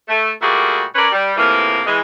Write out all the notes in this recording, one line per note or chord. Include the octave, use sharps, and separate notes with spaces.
A3
A#2 G3 A3 A#3 F#4 G#4
C#4 A#4 B4 C#5 D5
G3
A2 C3 E3 F3 A#3
E3 G#3